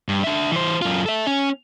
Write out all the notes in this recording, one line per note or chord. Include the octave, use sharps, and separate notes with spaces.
G2
D4 E5
E3 C5
F#2 F4
A4 E5
C#4